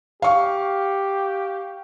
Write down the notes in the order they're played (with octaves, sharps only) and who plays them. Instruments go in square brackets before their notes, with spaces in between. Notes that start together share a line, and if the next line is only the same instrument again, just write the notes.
[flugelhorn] G4 [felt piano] F5 C#6